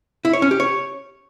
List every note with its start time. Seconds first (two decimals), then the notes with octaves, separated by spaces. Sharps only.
0.25 E4
0.33 C#5
0.42 C#4
0.51 G4
0.60 C#5